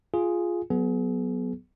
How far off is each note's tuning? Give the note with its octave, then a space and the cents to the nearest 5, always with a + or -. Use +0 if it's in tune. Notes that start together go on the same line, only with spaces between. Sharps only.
F4 +0 G#4 +0
F#3 +0 B3 +0 G#4 +35